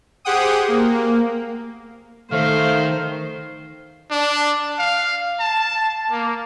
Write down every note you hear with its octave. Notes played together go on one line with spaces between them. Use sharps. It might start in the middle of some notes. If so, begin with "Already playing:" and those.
G4 G#4 C5 F#5 G5 D#6
A#3
D#3 A3 C5 F5
D4
F5
A5
A#3